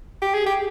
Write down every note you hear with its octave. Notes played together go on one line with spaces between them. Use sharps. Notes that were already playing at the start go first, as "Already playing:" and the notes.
G4
G#4
G4